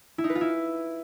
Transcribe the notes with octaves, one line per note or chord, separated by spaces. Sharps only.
E4
D#4
B4
F4
E4